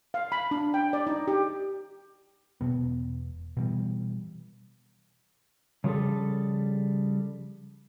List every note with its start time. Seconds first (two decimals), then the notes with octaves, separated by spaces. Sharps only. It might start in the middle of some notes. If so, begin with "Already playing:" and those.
0.14 F5
0.32 B5
0.51 D4
0.74 G5
0.93 D5
1.07 D#4
1.28 G4
2.61 E1 G2 B2 B3
3.57 B2 E3 G3
5.84 C#3 F3 G3 G#4 A4